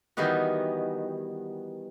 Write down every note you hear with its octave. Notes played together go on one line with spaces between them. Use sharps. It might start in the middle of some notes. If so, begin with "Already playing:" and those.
D#3 E3 G3 B3 D#4 F#4